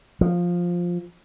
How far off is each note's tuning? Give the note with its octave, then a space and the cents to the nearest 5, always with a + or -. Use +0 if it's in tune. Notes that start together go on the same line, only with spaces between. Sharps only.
F3 +5